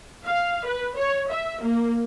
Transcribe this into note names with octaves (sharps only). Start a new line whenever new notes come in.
F5
B4
C#5
E5
A#3